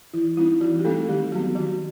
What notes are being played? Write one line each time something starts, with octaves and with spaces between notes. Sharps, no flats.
E3 E4
G3 C4 D#4 E4
E3 F#4
G4
G3 A3 C4 D#4 A4
D#3 G3 G4
F#3 B3 F#4
D#3 F#4